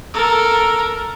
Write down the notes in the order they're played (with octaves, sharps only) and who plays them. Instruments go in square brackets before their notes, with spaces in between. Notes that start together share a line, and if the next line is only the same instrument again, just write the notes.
[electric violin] A4 A#4